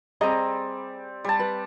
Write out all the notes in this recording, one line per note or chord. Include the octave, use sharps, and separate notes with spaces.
G3 C4 G#4 D#5 A#5
G3 A5
B4